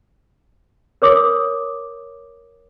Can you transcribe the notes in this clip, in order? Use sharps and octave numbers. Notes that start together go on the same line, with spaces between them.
A#4 C#5 D6 D#6